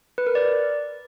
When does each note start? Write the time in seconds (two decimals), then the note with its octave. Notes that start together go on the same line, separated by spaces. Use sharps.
0.18 B4
0.27 A#4
0.35 D5